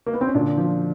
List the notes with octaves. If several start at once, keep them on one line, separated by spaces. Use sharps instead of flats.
A#3
B3
C4
C#4
A#2 D3 D4
F3